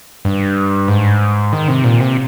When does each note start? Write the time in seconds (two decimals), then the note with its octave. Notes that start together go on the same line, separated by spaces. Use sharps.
0.25 G2
0.88 G#2
1.53 D#3
1.68 C3
1.84 A#2
2.00 C3